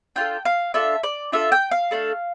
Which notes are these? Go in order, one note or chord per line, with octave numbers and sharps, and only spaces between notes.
D4 F4 A4 G5
F5
D4 F4 A4 E5
D5
D4 F4 A4 E5
G5
F5
A3 D4 A4